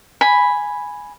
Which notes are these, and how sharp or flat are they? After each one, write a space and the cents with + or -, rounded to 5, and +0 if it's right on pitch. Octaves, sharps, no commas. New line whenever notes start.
G#5 +0 B5 +0